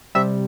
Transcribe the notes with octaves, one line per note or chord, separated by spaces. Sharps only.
C3 G3 E5